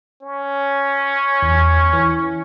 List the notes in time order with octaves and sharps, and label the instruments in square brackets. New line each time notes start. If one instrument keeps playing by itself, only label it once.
[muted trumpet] C#4
[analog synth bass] E2
E3